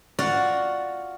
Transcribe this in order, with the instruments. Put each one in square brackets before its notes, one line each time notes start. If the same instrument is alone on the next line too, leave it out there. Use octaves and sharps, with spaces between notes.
[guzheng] F4 F#4 D5 F5 F#5